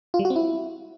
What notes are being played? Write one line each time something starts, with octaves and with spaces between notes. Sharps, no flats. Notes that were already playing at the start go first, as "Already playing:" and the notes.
F4
G3
F#4
C4
E4